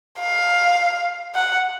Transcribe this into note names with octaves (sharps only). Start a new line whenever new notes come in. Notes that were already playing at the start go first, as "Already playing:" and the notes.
F5
F#5